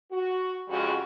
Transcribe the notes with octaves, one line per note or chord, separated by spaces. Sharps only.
F#4
F2 C#3 G3 G#3 F#4